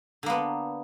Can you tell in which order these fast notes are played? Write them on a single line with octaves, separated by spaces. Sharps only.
D3 A#3 B3